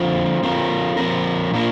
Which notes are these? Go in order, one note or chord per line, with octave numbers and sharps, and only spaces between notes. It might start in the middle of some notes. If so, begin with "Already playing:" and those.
Already playing: D3 F3 C4 F4
F3 C4 F4 A#4
F3 C4 A#4
A#2 A#3 D4 F4 A#4